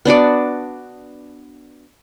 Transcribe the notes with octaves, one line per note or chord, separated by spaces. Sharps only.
B3 D4 F#4 D5